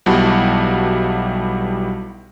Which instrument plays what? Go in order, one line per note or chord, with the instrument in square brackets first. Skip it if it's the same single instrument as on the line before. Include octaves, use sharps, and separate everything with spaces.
[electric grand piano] B1 G3 B3 E4 F#4 A5